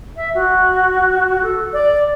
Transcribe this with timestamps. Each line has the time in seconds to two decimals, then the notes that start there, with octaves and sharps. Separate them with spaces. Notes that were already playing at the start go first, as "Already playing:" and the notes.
0.17 E5
0.35 F#4
1.43 A4
1.73 D5